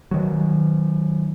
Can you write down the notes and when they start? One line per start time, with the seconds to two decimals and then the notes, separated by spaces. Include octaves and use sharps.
0.11 D#3 F#3